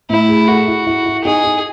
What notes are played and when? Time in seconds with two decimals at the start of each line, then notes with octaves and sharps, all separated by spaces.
0.10 A2 E4
0.29 G#4
0.47 F#4 A4
0.68 E4
0.86 E4
1.06 E4
1.24 D#4 G#4
1.44 D#4